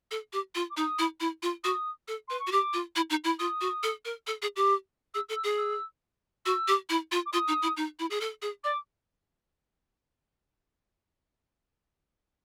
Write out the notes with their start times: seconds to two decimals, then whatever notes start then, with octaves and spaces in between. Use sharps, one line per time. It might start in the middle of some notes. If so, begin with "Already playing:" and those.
0.11 A4
0.33 G4
0.55 F4
0.70 D6
0.77 D#4 D#6
0.99 E4
1.20 E4
1.43 F4
1.64 F#4 D#6
2.08 A4
2.28 B4 C6
2.40 C#6
2.47 F#4
2.52 G4 D6
2.74 F4
2.96 E4
3.10 D#4
3.24 E4
3.39 F4 D#6
3.61 F#4
3.83 A4
4.05 A#4
4.27 A4
4.42 G#4
4.56 G4
5.14 G#4 E6
5.29 A4
5.36 E6
5.44 G#4
5.58 E6
6.46 F#4 E6
6.68 G4
6.90 E4
7.12 F4
7.26 D6
7.33 F4 D#6
7.48 D#4
7.62 E4
7.77 D#4
7.99 E4
8.10 G#4
8.21 A4
8.42 G#4
8.64 D5 D6